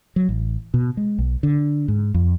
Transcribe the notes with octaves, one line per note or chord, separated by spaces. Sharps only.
F#3
A1
B2
G#3
B1
D3
G#2
F2